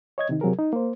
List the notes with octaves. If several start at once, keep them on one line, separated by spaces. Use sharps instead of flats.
C#5 D#5 G#6
C3 D#3 D#4
C3 F#3 G#4 A#4
D#4
A#3 C5